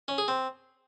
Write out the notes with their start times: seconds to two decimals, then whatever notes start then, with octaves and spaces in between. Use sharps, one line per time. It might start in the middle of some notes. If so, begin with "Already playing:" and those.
0.08 C#4
0.18 G#4
0.28 C4